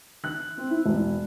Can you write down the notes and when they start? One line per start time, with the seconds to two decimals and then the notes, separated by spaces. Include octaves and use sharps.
0.24 F#6
0.58 C4
0.70 E4
0.86 E1